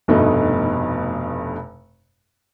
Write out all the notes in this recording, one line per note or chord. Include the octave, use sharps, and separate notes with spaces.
F1 G2 B2 A3 D#4